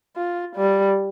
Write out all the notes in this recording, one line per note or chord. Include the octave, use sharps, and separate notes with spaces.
F4
G3